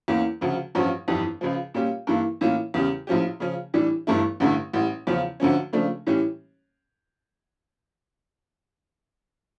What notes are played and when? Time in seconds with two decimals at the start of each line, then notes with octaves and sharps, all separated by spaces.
0.08 E2 E3 A#3 C#4
0.41 D2 C#3 F3
0.75 A1 G2 F3 C#4 F4
1.08 G1 F2 E3 G3
1.41 C#2 C#3 F3
1.74 A#2 G3 C#4 G4
2.07 G2 E3 A#3
2.41 A2 E3 A#3 C#4 F4
2.74 E2 C#3 G3 C#4 G4
3.07 A#1 A2 F3 C#4 G4
3.40 C#3 F3 C#4
3.74 A2 E3 G3 D4 G4
4.07 G1 G2 E3 A3 E4
4.40 A1 G2 D3 A3 E4
4.73 A1 A2 G3
5.07 E2 C#3 F3 C#4 F4
5.40 D2 D3 F3 C#4
5.73 C#3 F3 A3 D4
6.07 A2 E3 G3 C#4 G4